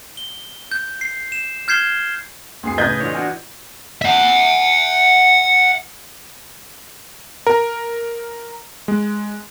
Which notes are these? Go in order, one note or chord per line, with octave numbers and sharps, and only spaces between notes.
G7
G6
C7
E7
F6 G6 G#6 C7 E7 G7
D2 G#4 C7
A2 C#3 D#4 B4 D#5 G6 G#6
D3 E3 F4 C#5
D4 F#4 G#5
E5 F#5
A#4
G#3